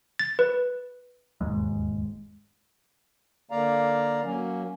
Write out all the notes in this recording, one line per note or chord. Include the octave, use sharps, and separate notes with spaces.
A6
B4
E1 D#2 G#2 G#3
D3 A#3 D5 F5 A#5
F#3 A#3 C#4